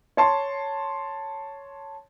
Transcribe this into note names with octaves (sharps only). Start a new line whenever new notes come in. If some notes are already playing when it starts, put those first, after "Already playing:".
C#5 A5 C6